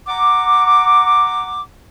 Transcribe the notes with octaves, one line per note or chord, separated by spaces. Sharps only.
F#5 A#5 D6